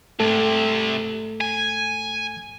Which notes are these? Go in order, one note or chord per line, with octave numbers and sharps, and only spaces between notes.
C2 G#2 C3 A3 A4
G#5